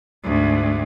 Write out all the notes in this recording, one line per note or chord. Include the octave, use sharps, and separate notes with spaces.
D2 G#2